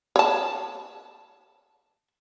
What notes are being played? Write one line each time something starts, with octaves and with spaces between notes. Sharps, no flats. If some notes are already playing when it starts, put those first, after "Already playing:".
C#5 A5